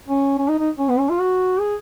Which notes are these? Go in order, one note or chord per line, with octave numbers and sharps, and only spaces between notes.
C#4
C#4
D#4
D#4
C#4
B3
C#4
F4
F#4
G#4